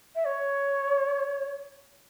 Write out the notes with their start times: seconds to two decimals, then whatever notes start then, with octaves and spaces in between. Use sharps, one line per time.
0.15 E5
0.25 C#5